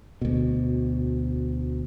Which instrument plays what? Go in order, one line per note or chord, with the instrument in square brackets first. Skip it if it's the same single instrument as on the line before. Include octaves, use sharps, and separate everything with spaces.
[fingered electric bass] D2 B2